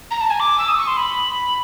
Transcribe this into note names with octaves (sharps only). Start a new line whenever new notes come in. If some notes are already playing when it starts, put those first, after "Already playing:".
A#5
A5
G#5
D6
E6
D#6
C#6
C6
B5